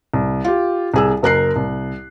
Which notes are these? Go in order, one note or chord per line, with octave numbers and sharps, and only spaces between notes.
C2
F4 G4
C2 G#4 E6
F#1 A#4 F#6 C7
C2